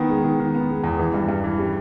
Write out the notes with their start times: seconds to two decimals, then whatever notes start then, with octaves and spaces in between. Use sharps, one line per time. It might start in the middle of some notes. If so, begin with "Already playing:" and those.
Already playing: D#3 B3
0.09 G#3
0.24 D#3
0.39 D#3
0.55 B3
0.69 G#3
0.83 E2
0.99 E3
1.14 G2
1.29 G2
1.44 E3
1.59 G3